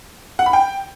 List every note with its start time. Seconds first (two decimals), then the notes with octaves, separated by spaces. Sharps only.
0.39 F#5
0.46 B5
0.53 G5